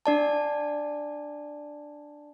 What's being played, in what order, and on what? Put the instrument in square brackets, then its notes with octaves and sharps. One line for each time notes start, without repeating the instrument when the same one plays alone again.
[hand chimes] D4 D5 A5